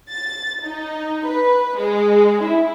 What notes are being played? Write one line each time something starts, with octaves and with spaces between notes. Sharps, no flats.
A6
D#4
B4
G#3
E4